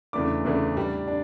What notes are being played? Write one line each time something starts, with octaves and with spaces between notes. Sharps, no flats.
E2 C#3 E3 A3 D4 D6
E2 C#3 E3 A3 D4
A2 G3 D4
D4